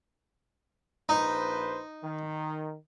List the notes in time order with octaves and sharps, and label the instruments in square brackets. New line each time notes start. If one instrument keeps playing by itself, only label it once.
[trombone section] A#1 B4 C5 [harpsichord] D#4
[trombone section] D#3